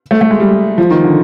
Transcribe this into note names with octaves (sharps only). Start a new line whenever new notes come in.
A3
A3
G#3
G3
F3
D#3
D3